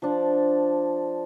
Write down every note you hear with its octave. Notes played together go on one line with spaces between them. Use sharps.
F3 D4